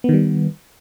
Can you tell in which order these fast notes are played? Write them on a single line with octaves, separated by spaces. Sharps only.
B3 D#3 G3